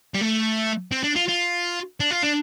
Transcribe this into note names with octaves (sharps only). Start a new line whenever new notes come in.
G3
A3
C4
D4
F4
F4
D4
F4
D4